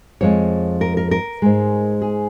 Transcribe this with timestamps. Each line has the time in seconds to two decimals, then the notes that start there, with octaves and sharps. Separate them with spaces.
0.21 F2 F3 G#3 C#5
0.81 A#4
0.97 A#4
1.11 A#4
1.42 G#2 G#3
2.02 G#4